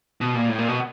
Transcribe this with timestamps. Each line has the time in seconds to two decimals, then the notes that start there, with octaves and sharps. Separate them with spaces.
0.21 B2
0.35 A#2
0.49 A2
0.58 A#2
0.68 B2